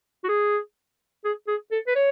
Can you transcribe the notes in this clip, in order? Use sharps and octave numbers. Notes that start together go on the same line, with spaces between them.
F#4
G#4
G#4
G#4
A4
B4
C#5